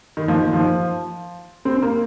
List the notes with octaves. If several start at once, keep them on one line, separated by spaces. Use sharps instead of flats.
D#3
F3
D#3
F3
C4
A#3